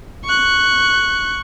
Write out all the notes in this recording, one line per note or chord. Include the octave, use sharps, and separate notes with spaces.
C#6 F#6